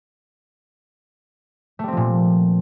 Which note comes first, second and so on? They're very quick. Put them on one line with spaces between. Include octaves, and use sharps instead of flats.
A3 G3 C4 F3 A#2